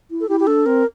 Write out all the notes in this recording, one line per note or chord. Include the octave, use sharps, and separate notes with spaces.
E4
A4
E4 G4
G4
D4 A4
C4 A#4